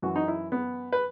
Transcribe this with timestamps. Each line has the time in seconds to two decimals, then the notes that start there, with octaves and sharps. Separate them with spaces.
0.02 F#2 E3 F#4
0.16 D#4
0.28 E4
0.52 B3
0.92 B4